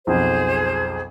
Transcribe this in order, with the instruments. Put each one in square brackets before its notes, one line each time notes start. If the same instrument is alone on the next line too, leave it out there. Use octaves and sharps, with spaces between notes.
[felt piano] B1 F2 [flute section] G#4 C5